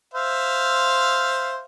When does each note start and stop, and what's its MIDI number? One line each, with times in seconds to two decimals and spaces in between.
0.14 1.65 72
0.14 1.65 76
0.14 1.65 77